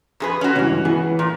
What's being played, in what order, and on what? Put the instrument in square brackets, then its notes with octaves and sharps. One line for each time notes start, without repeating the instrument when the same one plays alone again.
[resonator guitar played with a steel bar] F2 G#4 B4
C#4 F#4
[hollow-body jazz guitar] C#2 G2 E3
E3 B3 G#4
[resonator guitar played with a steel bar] A#2